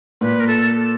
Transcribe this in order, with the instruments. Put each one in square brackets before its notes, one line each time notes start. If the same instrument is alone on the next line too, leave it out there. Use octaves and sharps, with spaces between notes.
[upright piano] A#2 [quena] B4
[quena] A#4
A4